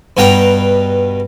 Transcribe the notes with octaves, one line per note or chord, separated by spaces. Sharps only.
G2 B2 F#5 G5 A#5